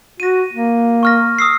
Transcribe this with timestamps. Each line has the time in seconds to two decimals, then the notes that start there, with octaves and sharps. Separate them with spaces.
0.20 F#4 A#6 D#7
0.53 A#3
1.03 C#6 F6 A#6
1.39 D#6 E6 C7